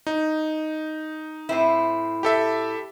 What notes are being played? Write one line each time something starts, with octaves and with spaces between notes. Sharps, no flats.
D#4
A2 C4 E4
G4 A4 E5